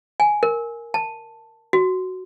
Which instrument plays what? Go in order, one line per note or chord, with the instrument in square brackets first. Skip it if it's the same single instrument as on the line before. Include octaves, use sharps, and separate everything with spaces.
[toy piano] G#5
A#4
A5
F#4